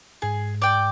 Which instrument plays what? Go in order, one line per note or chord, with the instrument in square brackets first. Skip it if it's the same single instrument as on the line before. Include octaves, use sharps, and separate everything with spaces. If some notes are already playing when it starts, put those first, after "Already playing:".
[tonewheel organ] G#2 [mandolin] G#4
[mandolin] D5 G5